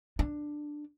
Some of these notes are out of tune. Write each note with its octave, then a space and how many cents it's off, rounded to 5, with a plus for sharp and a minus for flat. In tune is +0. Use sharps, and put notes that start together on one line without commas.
D4 +10